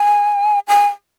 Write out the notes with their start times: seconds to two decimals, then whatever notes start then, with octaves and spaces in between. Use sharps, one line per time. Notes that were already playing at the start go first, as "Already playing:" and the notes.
Already playing: G#5
0.68 G#5